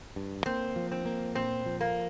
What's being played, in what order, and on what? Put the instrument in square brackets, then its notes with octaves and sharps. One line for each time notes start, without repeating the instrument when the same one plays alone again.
[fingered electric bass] G2
[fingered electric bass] A#3 [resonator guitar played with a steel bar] C4
[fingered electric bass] F3
[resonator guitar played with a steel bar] C4
[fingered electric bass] A#3
[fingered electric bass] A#2 [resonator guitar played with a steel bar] C4
[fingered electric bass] F3
[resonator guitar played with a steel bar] A#3